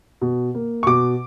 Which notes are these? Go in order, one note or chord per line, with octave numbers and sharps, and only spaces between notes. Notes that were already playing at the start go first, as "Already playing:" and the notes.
B2
A#3
C#6
B2 D6